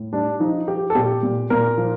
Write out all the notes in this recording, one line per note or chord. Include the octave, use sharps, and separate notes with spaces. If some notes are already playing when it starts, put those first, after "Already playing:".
Already playing: A2
G3 D4
F3 D#4
F3 G4
A4
A#2 G4
A#2
A#2 A#4
F3